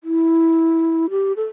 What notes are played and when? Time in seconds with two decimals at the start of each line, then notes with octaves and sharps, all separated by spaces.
0.04 E4
1.10 G4
1.37 A4